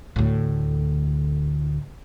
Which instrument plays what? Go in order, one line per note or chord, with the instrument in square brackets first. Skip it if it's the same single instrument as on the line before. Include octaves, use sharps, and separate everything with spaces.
[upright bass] D2 A2